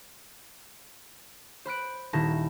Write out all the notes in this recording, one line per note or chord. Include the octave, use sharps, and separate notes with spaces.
C5 B5 F#6 D7
D#1 D#3 E4 A5 A#6